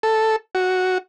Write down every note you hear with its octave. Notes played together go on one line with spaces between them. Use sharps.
A4
F#4